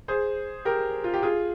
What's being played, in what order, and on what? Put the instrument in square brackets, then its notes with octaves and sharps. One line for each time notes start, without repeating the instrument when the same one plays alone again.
[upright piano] G#4 C5
G4 A#4
F4
G4
F4 G#4